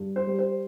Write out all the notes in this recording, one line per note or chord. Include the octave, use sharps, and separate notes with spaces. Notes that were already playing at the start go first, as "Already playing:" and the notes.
Already playing: G2
C5
G3
C5